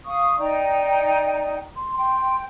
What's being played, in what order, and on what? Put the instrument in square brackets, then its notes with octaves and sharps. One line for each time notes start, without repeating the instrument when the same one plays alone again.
[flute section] F5 C#6 D#6
[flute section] D#4 G5 A#5 [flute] D5
[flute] C6
[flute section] G5 [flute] C6